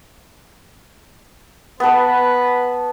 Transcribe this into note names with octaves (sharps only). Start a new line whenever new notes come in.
B3 A4 B4